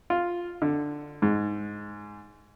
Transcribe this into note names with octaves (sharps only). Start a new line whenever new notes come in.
F4
D3
G#2